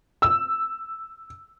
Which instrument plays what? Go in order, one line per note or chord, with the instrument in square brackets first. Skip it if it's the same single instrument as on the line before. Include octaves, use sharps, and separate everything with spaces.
[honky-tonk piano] E6